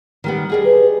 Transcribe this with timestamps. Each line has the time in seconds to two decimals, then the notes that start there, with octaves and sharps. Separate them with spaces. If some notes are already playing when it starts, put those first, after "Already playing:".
0.24 D#3 G3 B3
0.50 G3 G#4 D#5
0.65 B4